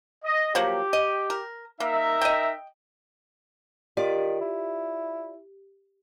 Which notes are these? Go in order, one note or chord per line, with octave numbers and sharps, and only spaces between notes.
D#5
F3 F#3 A#3 G4
D#5
A#4
A#3 D#4 A#4 E5
D#5 G5
D#3 F4 G4 D5
E4